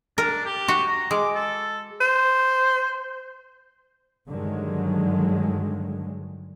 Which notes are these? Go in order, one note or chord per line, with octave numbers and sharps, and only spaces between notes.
D4 A#4
G4
F#4
A#5
G#3 D6
A4
C5
G2 D3 D#3 F#3 G#3